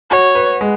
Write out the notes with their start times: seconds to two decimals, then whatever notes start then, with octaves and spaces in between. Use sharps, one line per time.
0.11 F#4 C#5
0.35 B4
0.61 G#3